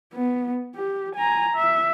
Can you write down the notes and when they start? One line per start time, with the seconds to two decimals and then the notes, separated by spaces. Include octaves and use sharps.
0.14 B3
0.76 G4
1.15 G#5 A#5
1.56 E5